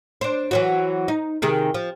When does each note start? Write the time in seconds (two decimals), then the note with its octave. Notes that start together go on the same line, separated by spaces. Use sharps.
0.21 D4 C5
0.51 E3 F#3 F#4
1.08 D#4
1.42 C3 D#3 G#4
1.74 F3